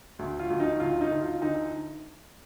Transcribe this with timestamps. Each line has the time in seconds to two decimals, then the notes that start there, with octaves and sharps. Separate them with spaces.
0.19 D2
0.39 F4
0.50 D2
0.60 D#4
0.80 D2 F4
1.01 D#4
1.11 D2
1.21 F4
1.41 D3 D#4